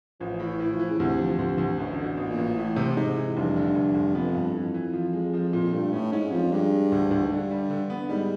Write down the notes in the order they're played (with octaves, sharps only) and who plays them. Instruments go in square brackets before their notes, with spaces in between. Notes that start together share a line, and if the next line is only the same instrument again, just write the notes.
[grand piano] A1 [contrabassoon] F3
[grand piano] A2
[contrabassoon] E3
[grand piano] A2
[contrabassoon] E3
F3
[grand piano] E3
[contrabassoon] C#3
[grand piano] D2 [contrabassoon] C3
[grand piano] F3
[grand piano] D2 [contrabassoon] C3
[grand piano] D2
[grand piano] A1 [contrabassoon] F#2
[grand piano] D3
[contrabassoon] B2
[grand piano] A1
[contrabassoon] A#2
[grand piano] A1
[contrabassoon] A2 [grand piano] E3
[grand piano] C3
[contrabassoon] G#2 [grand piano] C3
[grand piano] E3
[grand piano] F1 [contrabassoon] G2
[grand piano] D3
F1
F1
[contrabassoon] F2 [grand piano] B3
[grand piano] G2
[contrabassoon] F2 [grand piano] E3
[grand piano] E3
F3
G#3
F3
A#2
[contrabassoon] G2 [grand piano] A3
[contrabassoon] A2 [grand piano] C#4
[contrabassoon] G#2 [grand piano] C#4
[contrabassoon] F2 [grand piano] F3
[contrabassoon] G2 [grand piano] G#3
[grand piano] G#3
D2
D2
[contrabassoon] G#2
[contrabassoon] G2 [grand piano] D3
[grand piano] G3
D3
B3
[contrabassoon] G#2 [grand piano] G3